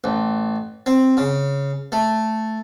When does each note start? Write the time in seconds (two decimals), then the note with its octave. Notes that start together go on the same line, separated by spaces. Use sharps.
0.04 A1
0.86 C4
1.17 C#3
1.92 A3